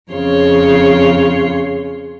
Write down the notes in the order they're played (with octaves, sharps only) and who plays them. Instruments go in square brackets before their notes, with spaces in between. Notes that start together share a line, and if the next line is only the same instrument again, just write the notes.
[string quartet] F2 C#3 C#5 C6